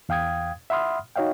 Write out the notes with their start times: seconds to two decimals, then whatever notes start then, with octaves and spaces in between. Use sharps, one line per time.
0.09 E2 F5 G5 D#6 G#6
0.70 E5 F#5 B5 C6 D#6 F6
1.16 D#4 F#4 C#5 D#5 F5 G5